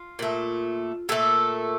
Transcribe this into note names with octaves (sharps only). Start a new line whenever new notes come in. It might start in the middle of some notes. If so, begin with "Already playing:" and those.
Already playing: F4
A#2 A3
A#2 A3 A4